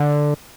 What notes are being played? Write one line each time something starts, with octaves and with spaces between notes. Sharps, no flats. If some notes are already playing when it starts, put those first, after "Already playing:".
Already playing: D3